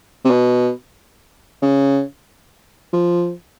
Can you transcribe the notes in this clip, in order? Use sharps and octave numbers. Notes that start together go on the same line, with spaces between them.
C3
B2
C#3
F3